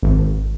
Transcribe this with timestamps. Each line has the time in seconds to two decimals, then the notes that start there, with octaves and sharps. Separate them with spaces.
0.03 G#1